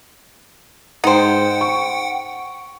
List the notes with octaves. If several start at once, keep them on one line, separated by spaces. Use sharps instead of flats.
G#2 D#4 C5 F#5 G5
C#6